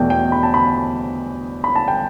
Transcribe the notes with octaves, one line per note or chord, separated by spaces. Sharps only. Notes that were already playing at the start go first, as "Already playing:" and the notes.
Already playing: E2 B2 A3 G5 A5
G5
B5
A5
B5
B5
A5
G5